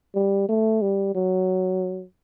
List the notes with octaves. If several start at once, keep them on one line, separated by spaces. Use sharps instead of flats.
G3
A3
G3
F#3